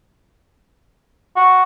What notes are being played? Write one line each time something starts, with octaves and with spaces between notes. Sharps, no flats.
F#4